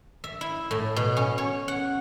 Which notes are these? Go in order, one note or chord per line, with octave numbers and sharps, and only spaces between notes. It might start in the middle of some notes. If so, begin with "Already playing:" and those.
E5
E4
A2
B2
C#4
C#5
F#5